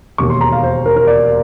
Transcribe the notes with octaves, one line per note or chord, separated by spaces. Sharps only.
E1 D#2 D#3 C#6
C6
A#5
F5
C5
A#4
A#4
D5